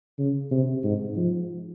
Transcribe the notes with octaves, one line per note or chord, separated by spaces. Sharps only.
C#3
C3
G#2
F3